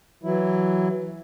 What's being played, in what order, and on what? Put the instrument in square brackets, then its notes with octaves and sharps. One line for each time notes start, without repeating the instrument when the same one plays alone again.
[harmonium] E3 F#3 E4